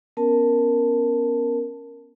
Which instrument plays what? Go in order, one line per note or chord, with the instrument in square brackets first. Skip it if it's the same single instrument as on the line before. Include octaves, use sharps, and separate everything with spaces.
[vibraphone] B3 C#4 A#4 A5